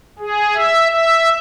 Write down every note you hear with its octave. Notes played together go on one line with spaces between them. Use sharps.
G#4
E5
E5